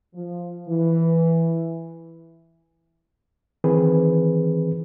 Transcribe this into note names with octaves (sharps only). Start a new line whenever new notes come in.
F3
E3
D#3 E3 C4 G#4 B4